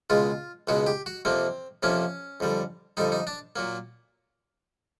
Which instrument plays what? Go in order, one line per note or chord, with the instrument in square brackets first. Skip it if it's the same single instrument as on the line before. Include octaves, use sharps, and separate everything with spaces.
[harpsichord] C#2 B2 G#3 F4
C#2 B2 G#3 F#4
G4
F#4
F2 C3 F3 A#3 C4
F2 C3 F3 A#3 C#4
F2 D3 G3
F2 D3 G3 D#4
D#4
D4
A#2 F#3 A#3